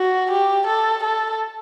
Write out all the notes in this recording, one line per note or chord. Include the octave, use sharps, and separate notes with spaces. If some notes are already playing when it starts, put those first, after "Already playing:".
Already playing: F#4
G4
A4
A4